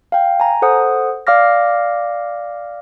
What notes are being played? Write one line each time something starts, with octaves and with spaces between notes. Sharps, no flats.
F5 G5
G#5 A#5
A4 C5 F#5 D#6
D5 F5 D6 F6 A#6